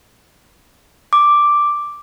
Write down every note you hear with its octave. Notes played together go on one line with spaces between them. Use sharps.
D6